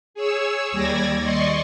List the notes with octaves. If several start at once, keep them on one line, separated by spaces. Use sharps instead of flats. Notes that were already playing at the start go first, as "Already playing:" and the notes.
G#4 C#5 E6
D#2 G3 D5 G#6 A#6
D5 D#5 C6 C#6